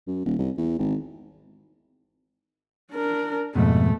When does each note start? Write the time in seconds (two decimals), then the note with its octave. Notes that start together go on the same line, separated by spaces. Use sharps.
0.07 F#2
0.25 D#1
0.39 C2
0.57 E2
0.79 G#1
2.93 D4 A#4
3.55 F2 G#2 B2 A3